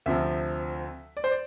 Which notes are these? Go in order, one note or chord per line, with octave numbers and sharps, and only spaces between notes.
D2 C3 F3 E5
D5
C5
D5